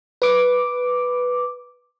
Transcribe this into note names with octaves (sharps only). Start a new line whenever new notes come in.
B4 D6